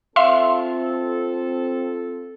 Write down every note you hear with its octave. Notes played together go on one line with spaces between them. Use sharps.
C4 F4 A4 E5 F5 C6